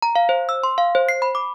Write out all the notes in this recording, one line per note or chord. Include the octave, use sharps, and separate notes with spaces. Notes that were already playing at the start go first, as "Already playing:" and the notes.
A#5
F5
C5
E6
C6
F5
C5
C7
B5
D6